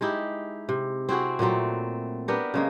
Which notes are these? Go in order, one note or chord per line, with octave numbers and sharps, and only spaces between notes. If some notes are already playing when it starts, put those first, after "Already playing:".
G#3 D#4 E4 G4
C3
C4 E4 F#4 G#4
A#2 F#3 A3 C4
B3 D4 G4 A#4
C#3 G#3 A#3